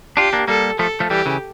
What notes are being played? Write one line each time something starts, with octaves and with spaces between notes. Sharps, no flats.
D4 F4 G4
A#3 D4
G3 A#3 A4
F3 A3 A4
F3 A3
E3 G3 G4
C#3 E3